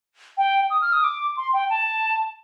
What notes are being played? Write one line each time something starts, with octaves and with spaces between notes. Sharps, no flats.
G5
D#6
F6
D#6
D6
C6
G5
A5